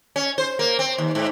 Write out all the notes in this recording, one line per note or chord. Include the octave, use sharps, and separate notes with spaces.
C#4
C5
A#3
C4
D#2
G#2